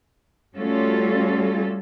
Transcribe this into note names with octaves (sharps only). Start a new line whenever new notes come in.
G3 A3 C#4 F4 F#4 A4